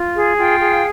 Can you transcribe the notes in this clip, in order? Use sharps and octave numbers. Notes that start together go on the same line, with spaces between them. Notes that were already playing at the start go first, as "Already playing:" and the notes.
Already playing: F4
G#4
F4 F5 G5
G#4